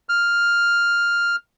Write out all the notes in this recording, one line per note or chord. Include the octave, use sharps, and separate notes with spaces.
F6